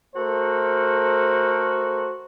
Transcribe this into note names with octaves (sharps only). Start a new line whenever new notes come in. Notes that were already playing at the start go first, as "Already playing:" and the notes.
A3 F#4 A4 A#4 C5